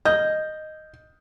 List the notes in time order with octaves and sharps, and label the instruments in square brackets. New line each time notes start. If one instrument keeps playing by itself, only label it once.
[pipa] D#5 [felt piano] G6